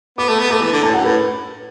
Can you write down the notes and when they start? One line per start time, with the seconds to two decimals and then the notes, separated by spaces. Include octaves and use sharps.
0.18 B3 D6
0.28 A3
0.39 B3
0.51 A3 D6
0.61 E3
0.72 D3
0.82 A2 A5
0.94 F#2 F#5
1.04 A2 B4